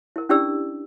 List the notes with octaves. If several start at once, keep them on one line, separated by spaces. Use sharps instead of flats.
E4 A#4
C#4 D4 E4 G4 D5 E6